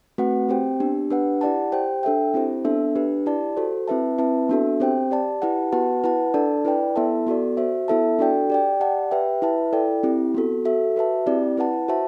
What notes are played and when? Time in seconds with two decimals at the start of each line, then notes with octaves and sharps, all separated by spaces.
0.18 A3 C4 F#4 B4 F#5
0.49 C4 G4 C5 G5
0.80 B3 D4 G4
1.10 D4 G4 B4 F#5
1.41 E4 G4 D5 F#5 A5
1.72 G4 C5 G5
2.03 D4 A4 E5 G5
2.34 C4 E4 G4 C5
2.65 B3 D4 A4 E5
2.95 D4 G4 B4
3.26 E4 G4 D5 A5
3.57 F#4 A4 C5
3.88 C4 E4 B4 E5 A5
4.18 C4 E4 B4 E5 A5
4.49 B3 D4 F#4 A4 E5
4.80 C4 G4 C5 G5
5.11 G4 D5 A5
5.42 E4 G4 B4 F#5 A5
5.72 B3 F#4 B4 F#5 A5
6.04 E4 B4 F#5 A5
6.34 D4 A4 D5 A5
6.65 E4 B4 D5 G5
6.96 B3 E4 A4 E5 A5
7.27 B3 F#4 A4 D5
7.57 F#4 C5 E5
7.88 B3 E4 A4 E5 A5
8.19 D4 F#4 A4 D5 G5
8.50 G4 D5 G5
8.80 G4 D5 F#5 A5
9.11 G4 B4 E5 G5
9.42 E4 B4 E5 A5
9.73 E4 A4 D5 G5
10.03 C4 E4 G4
10.35 B3 F#4 A4
10.65 F#4 A4 E5
10.96 F#4 B4 E5 A5
11.26 C4 E4 G4 D5
11.57 E4 B4 F#5 A5
11.88 F#4 C5 E5 A5